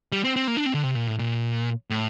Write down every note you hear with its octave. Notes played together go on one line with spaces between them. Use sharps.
G3
C4
C4
A#3
D4
C4
D3
C3
A#2
A2
A#2
A2